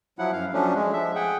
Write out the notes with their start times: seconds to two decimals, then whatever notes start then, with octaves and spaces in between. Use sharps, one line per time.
0.19 F3 F#3 E4 F#5
0.33 F#2 F5
0.53 F3 F#3 A3 C#4 D4
0.74 G#3
0.93 F3 E5
1.15 G#4 F#5 G5